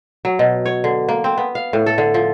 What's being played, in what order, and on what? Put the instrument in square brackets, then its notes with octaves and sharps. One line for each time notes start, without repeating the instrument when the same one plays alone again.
[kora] F#3
B2
C#5
D3
A#3
C4
B3
F5
A2
A4
D3
F3